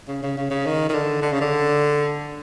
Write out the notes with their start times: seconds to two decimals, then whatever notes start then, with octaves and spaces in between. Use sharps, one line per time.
0.08 C#3
0.23 C#3
0.37 C#3
0.50 C#3
0.66 D#3
0.89 D#3
0.94 D3
1.22 D3
1.32 C#3
1.41 D3